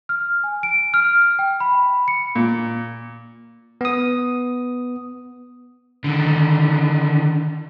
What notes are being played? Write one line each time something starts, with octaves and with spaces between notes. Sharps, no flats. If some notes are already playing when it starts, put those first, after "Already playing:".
F6
G#5
D7
F6
G5
B5
C#7
A#2
B3 D#6
D3 D#3